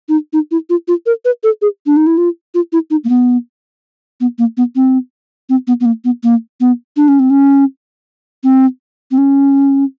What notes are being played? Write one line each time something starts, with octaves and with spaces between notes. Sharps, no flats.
D#4
D#4
E4
F4
F4
A#4
B4
A4
G#4
D4
D#4
E4
F4
F4
E4
D#4
A#3
B3
B3
A#3
B3
C4
C4
B3
B3
A#3
B3
A#3
B3
D4
C#4
C4
C#4
C4
C4
C#4